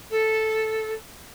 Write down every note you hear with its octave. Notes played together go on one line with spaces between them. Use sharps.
A4